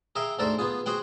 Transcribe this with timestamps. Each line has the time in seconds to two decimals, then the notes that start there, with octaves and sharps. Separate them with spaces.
0.15 G#4 A#4 E5 F5 G5
0.39 D2 G#2 A4 A#4 C5 D5
0.59 B3 F4 G#4
0.86 F#4 G#4 C5 F#5 G5